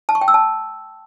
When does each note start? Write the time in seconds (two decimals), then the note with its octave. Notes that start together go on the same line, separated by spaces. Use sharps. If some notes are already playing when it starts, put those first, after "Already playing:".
0.09 A5
0.15 C#6
0.21 G5
0.28 E6
0.34 A5